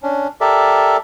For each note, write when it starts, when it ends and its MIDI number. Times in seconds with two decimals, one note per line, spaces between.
0.03 0.27 61
0.03 0.27 62
0.41 0.97 67
0.41 0.97 69
0.41 0.97 70
0.41 0.97 74
0.41 0.97 76